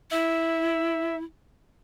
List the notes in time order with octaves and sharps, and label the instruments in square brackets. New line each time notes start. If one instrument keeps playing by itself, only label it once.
[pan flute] E4 [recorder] E5